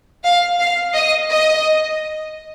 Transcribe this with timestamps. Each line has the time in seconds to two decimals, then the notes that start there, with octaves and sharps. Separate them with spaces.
0.24 F5
0.59 F5
0.94 D#5
1.29 D#5